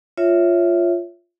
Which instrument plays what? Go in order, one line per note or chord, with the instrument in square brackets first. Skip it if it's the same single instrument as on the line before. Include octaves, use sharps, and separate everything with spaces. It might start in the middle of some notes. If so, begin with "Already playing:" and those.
[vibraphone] F4 C#5 E5